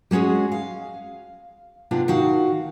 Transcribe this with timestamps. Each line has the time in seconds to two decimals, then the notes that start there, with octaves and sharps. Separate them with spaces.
0.11 G3 G#3 C#4 F#4 G#4
0.52 F5
1.91 C3 B3 D4 F4
2.08 D#3 F#4 F5